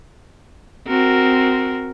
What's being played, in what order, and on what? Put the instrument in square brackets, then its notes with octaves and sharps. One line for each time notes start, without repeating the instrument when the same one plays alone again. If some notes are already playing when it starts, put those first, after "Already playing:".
[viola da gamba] C4 F#4 A#4